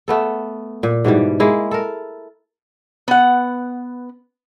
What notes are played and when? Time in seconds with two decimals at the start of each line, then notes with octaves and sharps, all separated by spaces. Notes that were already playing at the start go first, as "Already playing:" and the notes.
0.08 A3 B3 A4
0.83 A#2
1.04 G#2 B2 E3 G3
1.40 G#3 A#3 E4
1.71 A4 A#4
3.08 B3 F#5